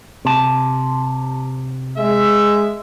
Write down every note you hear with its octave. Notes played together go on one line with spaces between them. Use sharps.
C3 A5
G#3 E5